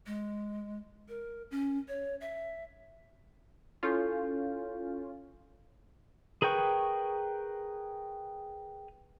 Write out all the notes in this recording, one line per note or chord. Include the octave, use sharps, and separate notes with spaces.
G#3
A#4
C#4
C#5
E5
C#4 E4 F4 A4 G6
G#4 A#4 B4 G5 C#6